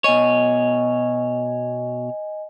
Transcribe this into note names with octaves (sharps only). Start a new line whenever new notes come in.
B2 C#5 D#5 G#5